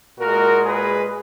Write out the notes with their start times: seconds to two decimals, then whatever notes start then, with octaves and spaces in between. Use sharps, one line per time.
0.19 A#2 G#3 F#4 A#4
0.64 G#4 B4